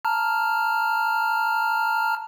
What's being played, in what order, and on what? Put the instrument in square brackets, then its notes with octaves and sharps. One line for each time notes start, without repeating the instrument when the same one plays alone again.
[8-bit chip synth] A5 A#5 F6